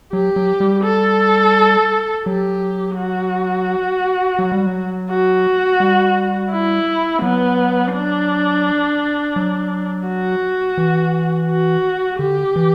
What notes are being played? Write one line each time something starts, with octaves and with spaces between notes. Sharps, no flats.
F#3 G4
F#3
G3
A4
F#3 G4
F#4
F#3
G3
F#3
F#4
G3
E4
F#3 B3
D4
F#3
F#4
E3
F#4
D3 G4
E3